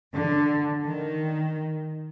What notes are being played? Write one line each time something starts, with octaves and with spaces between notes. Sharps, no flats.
D3
D#3